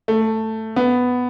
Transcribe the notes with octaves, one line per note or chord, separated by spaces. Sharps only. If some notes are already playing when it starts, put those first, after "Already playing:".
A3
B3